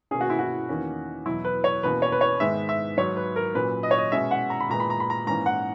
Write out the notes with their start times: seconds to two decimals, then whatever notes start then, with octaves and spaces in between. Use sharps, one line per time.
0.11 B2 A#3 C#4 G#4
0.21 F#4
0.30 E4
0.39 F#4
0.69 E2 D#3 A#3 C#4
1.26 E2 B2 F#3 E4
1.45 B4
1.64 C#5
1.83 E2 B2 A#3 C#4 B4
2.02 C#5
2.12 B4
2.21 C#5
2.40 G#2 D#3 G#3 B3 E5
2.69 E5
2.97 G#2 F#3 B3 C#5
3.17 B4
3.36 A#4
3.55 A#2 F#3 C#4 B4
3.83 D#5
3.91 C#5
3.98 D#5
4.12 B2 G#3 C#4 E5
4.31 F#5
4.50 A#5
4.60 B5
4.69 A#2 G#3 B3 A#5
4.80 B5
4.90 A#5
5.00 B5
5.10 A#5
5.26 G#2 E3 A#3 C#4 A#5
5.46 F#5